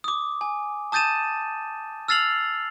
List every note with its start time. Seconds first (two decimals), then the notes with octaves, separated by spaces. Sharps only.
0.04 D6 D#6
0.41 G#5
0.92 A5 D#6 G6 A6 D#7 E7
2.08 E6 F6 A6 C7 F7 F#7